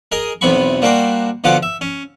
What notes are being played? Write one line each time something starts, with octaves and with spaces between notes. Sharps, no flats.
G#4 A#4 D#5
B1 E2 C3 B3 B5 C#6
G3 A#3 D4 F#4 C5 G5
B2 D3 F3 F4 F#5 D6
E5
C#4